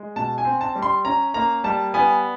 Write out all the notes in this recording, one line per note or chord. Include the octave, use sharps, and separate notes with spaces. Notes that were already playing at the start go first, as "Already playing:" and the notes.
Already playing: G#3
B2 A5
G#5
C4
A5
G3
C6
C#4 A#5
A#3 A#5
G3 A5
B3 G#5